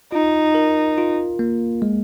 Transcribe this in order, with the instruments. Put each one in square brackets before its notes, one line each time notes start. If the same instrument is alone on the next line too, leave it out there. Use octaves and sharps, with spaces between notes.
[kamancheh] D#4 [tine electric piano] F4
[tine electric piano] A#4
F4
A#3
G#3